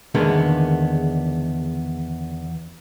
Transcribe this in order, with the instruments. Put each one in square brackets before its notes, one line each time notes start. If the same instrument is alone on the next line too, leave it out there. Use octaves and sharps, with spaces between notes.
[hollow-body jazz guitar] E2 D3 D#3 G#3 A#3 B3